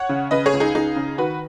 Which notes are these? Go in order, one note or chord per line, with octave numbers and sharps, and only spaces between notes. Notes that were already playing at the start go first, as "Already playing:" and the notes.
Already playing: C#5 F#5
C#3
C#3 B4 D#5
G#4 C#5
C#2
D#4 G#4
C#2 D#4 G#4
C#3
D#3 F#4 B4